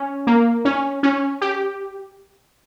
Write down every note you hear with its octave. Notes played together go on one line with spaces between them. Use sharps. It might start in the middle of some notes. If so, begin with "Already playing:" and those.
Already playing: C#4
A#3
C#4
C#4
G4